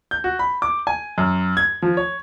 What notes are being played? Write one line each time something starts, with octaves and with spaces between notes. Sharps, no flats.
G6
F#4
B5
D6
G#5
F#2
G#6
F3
C#5